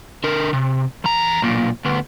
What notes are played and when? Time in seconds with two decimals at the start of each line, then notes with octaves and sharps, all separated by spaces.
0.24 D3 A#4
0.53 C3
1.04 E2 A#5
1.42 B1 A#2
1.85 D2 B3